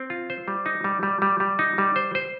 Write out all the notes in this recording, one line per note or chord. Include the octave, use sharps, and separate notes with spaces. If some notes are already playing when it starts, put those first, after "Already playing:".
Already playing: C4
F4
C5
G3
D#4
G3
G3
G3
G3
D#4
G3
C5
C5